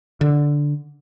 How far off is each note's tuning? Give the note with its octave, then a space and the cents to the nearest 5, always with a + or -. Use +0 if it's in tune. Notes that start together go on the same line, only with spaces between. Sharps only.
D3 -5